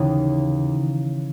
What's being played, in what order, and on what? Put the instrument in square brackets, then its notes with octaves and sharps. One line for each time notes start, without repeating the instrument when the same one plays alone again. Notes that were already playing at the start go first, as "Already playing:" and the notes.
Already playing: [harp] D#2 C#3 E3